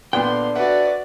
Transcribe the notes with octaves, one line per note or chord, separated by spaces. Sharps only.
A#2 D3 B3 G5 C6
F#4 B4 D5 E5 F#5